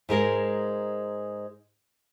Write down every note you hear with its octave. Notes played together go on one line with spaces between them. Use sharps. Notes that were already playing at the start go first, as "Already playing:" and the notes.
G#2 G#3 A#4 D#5